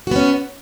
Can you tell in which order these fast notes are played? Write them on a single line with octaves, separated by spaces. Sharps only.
F#4 B3 C#4